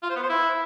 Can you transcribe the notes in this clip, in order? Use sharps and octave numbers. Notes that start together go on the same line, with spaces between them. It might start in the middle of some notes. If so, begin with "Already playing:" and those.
F4
C5
B3
C5
E4